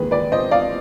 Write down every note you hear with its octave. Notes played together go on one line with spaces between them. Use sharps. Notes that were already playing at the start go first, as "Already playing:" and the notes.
Already playing: D#2 D#3 G#3 G#4 B4
B4 D5
C5 D#5
D5 F5